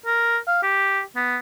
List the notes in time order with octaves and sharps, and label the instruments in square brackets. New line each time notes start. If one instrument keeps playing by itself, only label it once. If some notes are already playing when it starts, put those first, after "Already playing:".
[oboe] A#4
F5
G4
B3